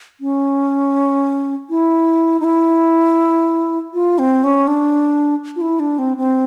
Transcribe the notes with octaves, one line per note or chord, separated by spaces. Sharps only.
C#4
E4
D#4
E4
F4
C4
C#4
D4
F4
E4
D4
C4
C4